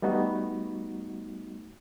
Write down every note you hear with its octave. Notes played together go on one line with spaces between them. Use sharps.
G3 A3 B3 D#4 F#4